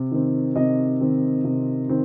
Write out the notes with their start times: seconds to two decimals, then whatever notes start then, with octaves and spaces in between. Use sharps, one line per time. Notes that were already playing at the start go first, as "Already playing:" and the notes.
Already playing: C3
0.12 D#3 C4
0.56 C3 D#5
1.01 D#3 C4
1.44 C3
1.89 D#3 C4